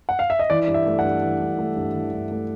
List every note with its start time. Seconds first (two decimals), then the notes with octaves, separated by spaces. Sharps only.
0.09 F#5
0.19 F5
0.30 E5
0.39 D#5
0.50 E3 D5
0.68 G2
0.74 E5
0.86 A3
0.99 F#5
1.05 G2
1.23 E3
1.41 G2
1.59 A3
1.76 G2
1.95 E3
2.13 G2
2.31 A3